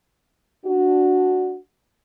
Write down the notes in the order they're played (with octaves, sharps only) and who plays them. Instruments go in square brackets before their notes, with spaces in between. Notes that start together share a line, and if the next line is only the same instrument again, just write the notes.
[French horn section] D4 F#4